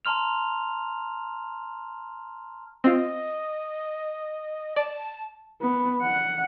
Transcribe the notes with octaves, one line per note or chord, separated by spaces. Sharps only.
A5 A#5 C6 F6 F7
C4 F4 D#5
D5 A5
B3
F#5